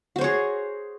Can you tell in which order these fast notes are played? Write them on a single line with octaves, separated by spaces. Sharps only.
F#4 C5 C#5 G#4